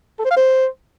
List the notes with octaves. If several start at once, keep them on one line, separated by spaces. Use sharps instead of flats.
A4
C5
F5
C5